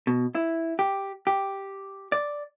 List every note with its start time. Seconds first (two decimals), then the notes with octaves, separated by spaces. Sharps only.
0.07 B2
0.35 E4
0.79 G4
1.27 G4
2.12 D5